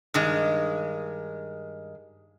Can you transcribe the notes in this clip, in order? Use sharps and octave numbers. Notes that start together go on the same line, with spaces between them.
G2 D#3 G#3